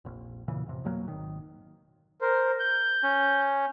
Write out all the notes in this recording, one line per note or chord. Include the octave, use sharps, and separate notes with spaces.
F1 A#1
E1 A#2 C#3 E3
A1 F2 C3
F2 B2 F#3 A#3
G#1 D#3
A#4 C5
G6
C#4